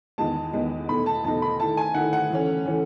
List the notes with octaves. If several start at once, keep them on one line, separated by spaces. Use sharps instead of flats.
E2 D#3 G#3 B3 A5
E2 D#3 G#3 B3
E2 B2 A3 D#4 B5
A5
E2 B2 A3 D#4 A5
B5
D#3 A3 E4 A5
G#5
D#3 A3 E4 F#5
F#5
E3 A3 C#4
E3 A3 C#4